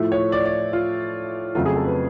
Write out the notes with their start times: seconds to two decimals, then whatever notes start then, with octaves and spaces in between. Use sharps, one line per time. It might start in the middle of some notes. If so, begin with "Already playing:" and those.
Already playing: A2 F3 A3
0.12 C#5
0.32 D5
0.45 D5
0.73 F4
1.55 F2 C#3 F#3 A3 F4
1.66 G#4
1.76 A4
1.85 B4